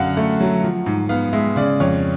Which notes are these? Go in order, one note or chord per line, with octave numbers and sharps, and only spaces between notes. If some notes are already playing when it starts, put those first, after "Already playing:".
Already playing: F#2 D3 F5 F#5
A3
F#3
F3
G#2
B3 F5
G#3 E5
C#3 D5
F2 C#5